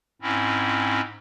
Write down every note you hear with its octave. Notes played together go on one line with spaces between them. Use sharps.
G#2 C4 C#4 E4